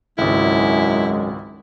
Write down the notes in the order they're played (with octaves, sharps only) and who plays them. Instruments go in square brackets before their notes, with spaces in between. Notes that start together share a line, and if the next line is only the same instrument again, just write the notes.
[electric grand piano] G#1 C#2 [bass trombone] F#2 [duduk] G#3 [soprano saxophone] E4